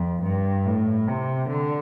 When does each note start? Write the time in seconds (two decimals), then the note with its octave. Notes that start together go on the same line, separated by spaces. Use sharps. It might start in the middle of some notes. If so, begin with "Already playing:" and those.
Already playing: F2
0.23 G2
0.65 A2
1.08 C3
1.49 D3